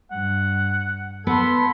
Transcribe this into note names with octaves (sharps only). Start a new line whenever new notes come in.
G2 F#5
B3 A4 B5 C6 G#6